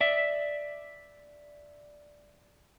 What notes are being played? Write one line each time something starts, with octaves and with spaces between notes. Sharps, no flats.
D5 E5